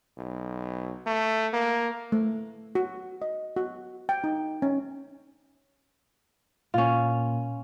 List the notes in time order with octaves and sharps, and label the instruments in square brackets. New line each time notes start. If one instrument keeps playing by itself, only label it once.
[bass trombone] B1
A3
A#3
[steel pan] A3
F#4
D#5
F#4
G5
D#4
C#4
[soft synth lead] A#2 [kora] C#4 F4